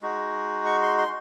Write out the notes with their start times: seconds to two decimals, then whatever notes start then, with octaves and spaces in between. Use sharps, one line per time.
0.02 G#3 D#4 F#4
0.65 C#6
0.82 C6
0.98 C6